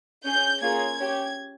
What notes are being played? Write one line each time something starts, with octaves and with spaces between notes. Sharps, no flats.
C#4 G#4 G6
A#3 C#4 F4 G#4 G#6
C#4 G4